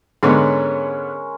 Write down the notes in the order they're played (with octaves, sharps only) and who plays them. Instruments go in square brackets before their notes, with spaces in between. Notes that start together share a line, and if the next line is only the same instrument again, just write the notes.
[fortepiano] G#2 D3 B3 [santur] G#3 C#4 A#4